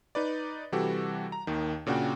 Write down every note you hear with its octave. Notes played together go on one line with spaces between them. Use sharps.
D#4 B4 D5
C3 E3 G3 F#4 G4 A4
A#5
D#2 D#3
A#2 C#3 D4 F#4 F#5 G5